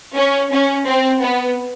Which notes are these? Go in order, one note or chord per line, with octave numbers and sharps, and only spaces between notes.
C#4
C#4
C4
B3